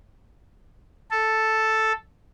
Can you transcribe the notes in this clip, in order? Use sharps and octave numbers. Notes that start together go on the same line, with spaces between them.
A4